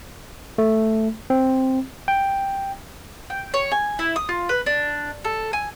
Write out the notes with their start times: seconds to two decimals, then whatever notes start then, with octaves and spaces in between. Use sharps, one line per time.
0.58 A3
1.30 C4
2.08 G5
3.30 G5
3.54 C#5
3.72 G#5
3.99 E4
4.16 D#6
4.29 F4
4.49 B4
4.66 D4
5.25 A4
5.53 G#5